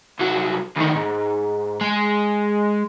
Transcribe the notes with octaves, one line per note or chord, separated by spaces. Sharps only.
C2 F#3
D2 D#3
G#2
G#3